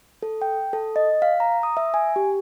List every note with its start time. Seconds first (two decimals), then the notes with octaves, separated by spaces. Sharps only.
0.23 A4
0.42 G5
0.73 A4
0.96 D#5
1.22 F5
1.40 A#5
1.63 D#6
1.77 E5
1.94 G#5
2.16 G4